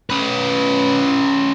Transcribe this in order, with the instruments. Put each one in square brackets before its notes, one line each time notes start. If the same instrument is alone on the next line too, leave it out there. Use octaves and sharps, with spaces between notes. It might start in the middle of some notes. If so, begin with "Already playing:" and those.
[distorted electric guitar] C#4 B4